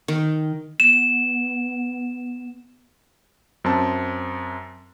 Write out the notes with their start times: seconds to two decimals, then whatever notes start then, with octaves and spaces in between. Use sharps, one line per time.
0.08 D#3
0.80 B3 E7
3.64 F#2 C4 A5